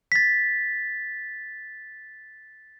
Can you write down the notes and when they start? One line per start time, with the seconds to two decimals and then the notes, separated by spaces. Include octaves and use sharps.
0.12 A6 B6